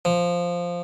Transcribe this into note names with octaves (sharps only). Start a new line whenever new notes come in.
F3